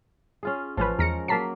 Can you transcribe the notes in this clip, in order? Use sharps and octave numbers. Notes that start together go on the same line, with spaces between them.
C#4 F4 G#4
A1 F3 C#4 B4
E2 G#3 A#4 A#6 C#7
F#3 A#3 A5 B6 C7